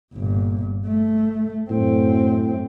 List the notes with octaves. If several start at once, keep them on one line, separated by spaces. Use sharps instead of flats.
G1 A#2
A3
F#2 A2 C4